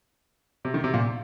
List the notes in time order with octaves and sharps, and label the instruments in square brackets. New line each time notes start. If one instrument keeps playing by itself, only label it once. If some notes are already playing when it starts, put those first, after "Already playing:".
[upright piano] C3
D#3
C3
A#2